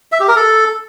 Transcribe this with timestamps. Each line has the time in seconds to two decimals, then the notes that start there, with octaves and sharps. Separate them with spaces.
0.12 E5
0.20 G4
0.28 A#4
0.36 A4